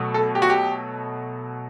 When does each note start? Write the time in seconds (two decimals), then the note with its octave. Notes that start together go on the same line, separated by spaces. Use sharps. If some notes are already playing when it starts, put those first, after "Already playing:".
Already playing: B2 F#3 A3
0.14 A4
0.35 G4
0.42 F#4
0.50 G4